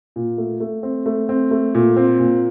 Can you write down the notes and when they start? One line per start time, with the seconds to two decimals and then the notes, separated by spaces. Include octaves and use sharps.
0.16 A#2
0.38 A3
0.60 A3
0.83 C4
1.06 A3
1.29 C4
1.51 A3
1.75 A#2
1.97 C4
2.20 A#2